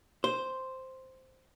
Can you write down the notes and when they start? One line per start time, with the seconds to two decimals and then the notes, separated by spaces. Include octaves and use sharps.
0.24 C5